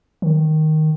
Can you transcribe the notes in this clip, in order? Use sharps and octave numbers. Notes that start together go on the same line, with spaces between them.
D#3